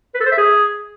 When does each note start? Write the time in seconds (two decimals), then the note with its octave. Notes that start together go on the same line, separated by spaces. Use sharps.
0.15 B4
0.20 A4
0.26 C5
0.32 E5
0.38 G#4